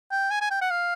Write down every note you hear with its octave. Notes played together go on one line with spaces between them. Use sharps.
G5
G#5
G#5
G5
F#5
F5